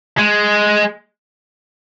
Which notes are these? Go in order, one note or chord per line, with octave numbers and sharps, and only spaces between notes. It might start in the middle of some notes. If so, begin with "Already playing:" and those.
G#3